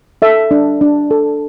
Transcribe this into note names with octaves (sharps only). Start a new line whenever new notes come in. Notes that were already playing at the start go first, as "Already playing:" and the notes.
A4 E5
D4
D4
A4